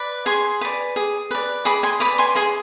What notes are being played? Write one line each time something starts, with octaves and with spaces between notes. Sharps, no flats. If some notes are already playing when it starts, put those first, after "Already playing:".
Already playing: B4 D5
G#4 G#5 C6
B4 D5
G#4
B4 D5
G#4 B5 D6
G#5 C6
B4 D5 B5 D6
G#5 C6
G#4 G#5 C6